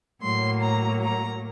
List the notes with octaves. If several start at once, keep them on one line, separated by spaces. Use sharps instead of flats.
A2 F#3 A#3 C6
A#5
A#5